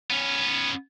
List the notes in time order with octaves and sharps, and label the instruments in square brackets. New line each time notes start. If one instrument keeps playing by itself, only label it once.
[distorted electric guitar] B3 C#4